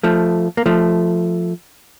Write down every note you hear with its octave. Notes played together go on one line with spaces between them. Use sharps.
F3 A3
A#3
F3 A3